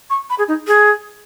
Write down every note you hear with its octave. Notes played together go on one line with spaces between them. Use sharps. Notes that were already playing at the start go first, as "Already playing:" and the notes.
C#6
B5
G#4
D#4
G#4